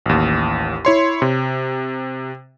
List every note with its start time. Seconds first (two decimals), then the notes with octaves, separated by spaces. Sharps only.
0.06 A1 D#2
0.85 E4 C#5 C6
1.22 C3